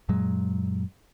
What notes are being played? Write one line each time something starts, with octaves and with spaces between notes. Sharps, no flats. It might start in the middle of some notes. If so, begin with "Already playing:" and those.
F#2 A#2 F#3 G#3